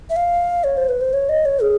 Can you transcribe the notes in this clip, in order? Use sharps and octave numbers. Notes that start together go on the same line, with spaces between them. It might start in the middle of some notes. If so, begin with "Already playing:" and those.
E5
F5
C#5
C5
B4
C5
C#5
D#5
C#5
G#4